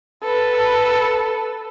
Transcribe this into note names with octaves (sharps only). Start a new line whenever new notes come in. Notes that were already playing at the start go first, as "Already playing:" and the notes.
A4 B4